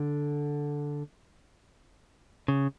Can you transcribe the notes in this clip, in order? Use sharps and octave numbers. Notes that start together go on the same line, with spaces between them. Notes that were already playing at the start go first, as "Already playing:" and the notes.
Already playing: D3
C#3